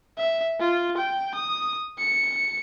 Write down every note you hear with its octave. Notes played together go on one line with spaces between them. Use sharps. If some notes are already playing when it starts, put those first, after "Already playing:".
E5
F4
G5
D#6
C#7